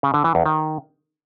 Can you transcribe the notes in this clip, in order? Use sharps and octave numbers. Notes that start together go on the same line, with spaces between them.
C#3
D3
E3
E2
D#3